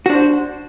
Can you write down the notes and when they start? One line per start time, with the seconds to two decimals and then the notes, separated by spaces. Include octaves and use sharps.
0.06 F#4
0.10 D4
0.13 C5